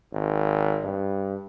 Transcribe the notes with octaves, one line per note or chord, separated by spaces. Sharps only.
G#1
G2